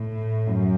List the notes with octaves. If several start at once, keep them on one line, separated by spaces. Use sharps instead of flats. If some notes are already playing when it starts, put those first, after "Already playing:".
Already playing: A2
F#2